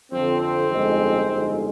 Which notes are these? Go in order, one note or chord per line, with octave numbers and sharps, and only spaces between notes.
F2 D3 F3 C4
C4
G1 F2 D#3 G#3
G1 F2 D#3 G#3